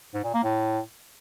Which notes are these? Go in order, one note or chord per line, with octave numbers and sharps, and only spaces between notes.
G#2
A#2
A#3
A2